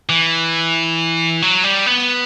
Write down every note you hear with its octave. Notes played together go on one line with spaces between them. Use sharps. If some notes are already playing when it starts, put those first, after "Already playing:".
E3
F#3
G3
B3